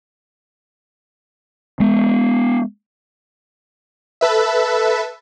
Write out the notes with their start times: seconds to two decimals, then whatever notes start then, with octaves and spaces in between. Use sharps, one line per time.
1.80 G#3 B3
4.21 A4 B4 E5